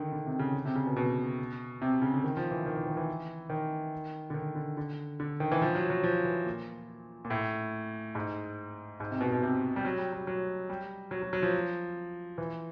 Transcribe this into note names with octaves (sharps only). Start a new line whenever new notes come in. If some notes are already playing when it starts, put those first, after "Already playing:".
Already playing: D3 D#3
D3
C3
C#3
D3
C3
C#3
B2
B2
C3
C#3
D3
D#3
F3
E3
D#3
E3
D#3
E3
D#3
D3
D#3
D3
D3
D3
D#3
E3
F3
F#3
F#3
F3
E3
A#2
A#2
A2
G#2
G#2
C3
B2
B2
C3
G3
F#3
G3
F#3
F#3
G3
F#3
F#3
F#3
F3
E3